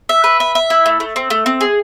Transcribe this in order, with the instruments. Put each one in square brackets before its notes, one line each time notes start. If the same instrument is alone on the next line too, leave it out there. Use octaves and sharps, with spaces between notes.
[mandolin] E5
B4
E5
E5
E4
A3
A3
C4
A3
C4
G#4